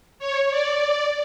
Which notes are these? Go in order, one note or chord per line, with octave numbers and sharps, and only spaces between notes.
C#5
D5